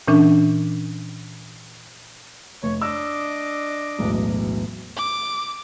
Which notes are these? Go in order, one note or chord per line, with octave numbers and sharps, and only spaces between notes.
A#2 E3 C#4 D4
F1 C#5
D4 D#5 D6 E6
E1 B1 A2
D6